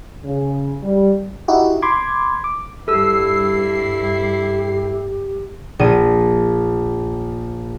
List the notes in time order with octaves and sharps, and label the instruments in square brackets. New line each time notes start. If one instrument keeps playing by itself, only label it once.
[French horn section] C#3
G3
[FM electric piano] D#4 E4 F#4 G4
B5 C6 D6 G#6
D6
[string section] G2 C7 [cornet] E4 [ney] G4 [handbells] A4 E6
[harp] A#1 D#7